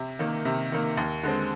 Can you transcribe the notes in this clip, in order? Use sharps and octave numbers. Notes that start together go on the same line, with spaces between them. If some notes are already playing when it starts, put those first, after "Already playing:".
Already playing: C3
D#3 A#3
C3
D#3 A#3
D#2
D3 G#3 C4